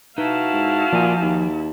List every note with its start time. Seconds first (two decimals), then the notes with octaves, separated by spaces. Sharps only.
0.18 D#4 E4 F#4 B4 F5 A5
0.53 G#2
0.92 A#2 F3 G#5
1.22 D#2